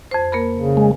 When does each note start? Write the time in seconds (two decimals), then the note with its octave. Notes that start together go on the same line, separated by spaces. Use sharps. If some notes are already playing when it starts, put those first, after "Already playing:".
0.11 F2 C5
0.32 A#3 A#4 B5
0.56 C#3
0.77 G#3